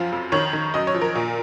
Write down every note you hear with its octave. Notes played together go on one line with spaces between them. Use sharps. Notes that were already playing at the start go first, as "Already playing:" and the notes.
Already playing: F#2 F3 F5
F2
D#3 C#5
D#3
F#2 D#5
C#5
F3
A#4
A#2